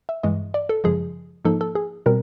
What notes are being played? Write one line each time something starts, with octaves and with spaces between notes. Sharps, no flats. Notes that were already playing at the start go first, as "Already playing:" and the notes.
E5
G2 E3 G#3 D#5
D5
A4
F#2 C#3 F3 G#3 G#4
G#2 F3 A#3 D#4 A4
A4
G#4
B2 G3 C4 A#4